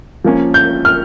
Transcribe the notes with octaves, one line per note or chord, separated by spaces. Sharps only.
F3 A#3 C#4
G6
F6